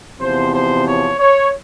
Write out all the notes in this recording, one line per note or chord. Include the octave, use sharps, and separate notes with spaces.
E2 C3 F3 C5
C5
C#5
C#5